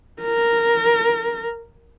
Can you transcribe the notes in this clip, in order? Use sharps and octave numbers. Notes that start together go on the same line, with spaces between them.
A#4